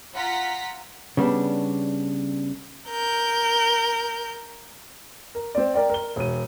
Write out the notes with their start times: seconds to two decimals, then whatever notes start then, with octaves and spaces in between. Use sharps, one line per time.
0.13 F4 F#5 A#5 B6
1.17 C#3 G3 B3 D4
2.90 A#4 G6
5.35 A#4
5.55 C4 D5
5.74 A#4 D5 G5
5.90 A#4 G7
6.16 E1 D#7